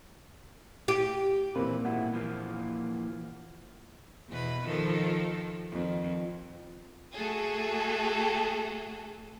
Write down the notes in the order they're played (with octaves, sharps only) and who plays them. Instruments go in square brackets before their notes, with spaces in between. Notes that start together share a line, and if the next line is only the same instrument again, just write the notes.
[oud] G4
[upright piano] A#2 [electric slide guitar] E3 F3 B4 [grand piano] A#3 C4
[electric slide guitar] G#2 B2 E4 [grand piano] F#5
[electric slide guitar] E3 F3 A#3
[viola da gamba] E2 B2 B4
D#3 F3 A4
F2 D#3
[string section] A3 F#4 G#4 A4